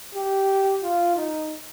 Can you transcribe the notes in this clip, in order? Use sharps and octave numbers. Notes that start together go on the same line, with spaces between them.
G4
F4
D#4